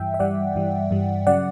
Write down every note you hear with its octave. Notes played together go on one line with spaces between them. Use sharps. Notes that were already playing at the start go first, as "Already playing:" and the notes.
Already playing: G2 E3 G3 E5 G5
E5
G2 E3 G3 D5 F#5
G2 E3 G3
G2 E3 G3
C#3 F#3 D5 F#5